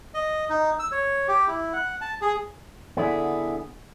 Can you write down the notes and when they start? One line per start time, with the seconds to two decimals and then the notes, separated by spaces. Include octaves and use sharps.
0.14 D#5
0.49 D#4
0.79 E6
0.92 C#5
1.28 G4
1.48 E4
1.73 F#5
2.01 A5
2.22 G#4
2.97 D3 B3 E4 G#4